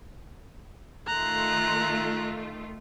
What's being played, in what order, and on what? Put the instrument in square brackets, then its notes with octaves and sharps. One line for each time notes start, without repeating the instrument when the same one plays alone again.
[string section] D#3 A3 F4 [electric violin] A#5 F#6